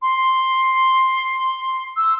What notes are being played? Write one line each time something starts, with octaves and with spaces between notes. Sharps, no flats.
C6
E6